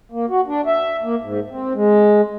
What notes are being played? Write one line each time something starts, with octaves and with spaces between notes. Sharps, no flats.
A#3
F#4
D4
E5
A#3
G#2
C4
G#3